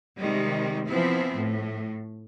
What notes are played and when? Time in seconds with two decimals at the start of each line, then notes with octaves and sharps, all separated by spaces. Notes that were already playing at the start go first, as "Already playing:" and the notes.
0.19 C3 D#3 G3 G#3
0.88 E3 F3 B3 C4 E4
1.37 A2